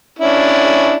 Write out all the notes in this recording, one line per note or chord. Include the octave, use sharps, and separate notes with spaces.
C#4 D4 E4